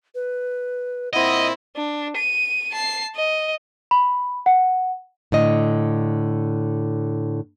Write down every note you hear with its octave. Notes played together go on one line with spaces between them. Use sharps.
B4
A#2 C4 E4 D#5 F#5
D4
D#7
A5 C7
D#5
B5
F#5
A2 D3 D#5